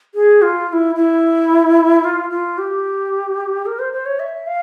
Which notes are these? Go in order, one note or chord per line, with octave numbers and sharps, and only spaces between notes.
G#4
F4
F4
E4
E4
F4
F4
G4
A#4
C5
C5
C#5
E5
F5